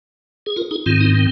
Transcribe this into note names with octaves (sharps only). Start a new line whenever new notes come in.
G#4
F4 A#4
D#4 G#4
G#2 D#3 C4 F4
D#4
C4